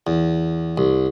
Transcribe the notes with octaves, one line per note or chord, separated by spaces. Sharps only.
E2
C2